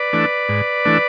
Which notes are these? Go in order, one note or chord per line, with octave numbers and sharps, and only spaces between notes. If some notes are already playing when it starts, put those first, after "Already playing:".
Already playing: B4 D5
E3 A3 D4
G#2
E3 A3 D4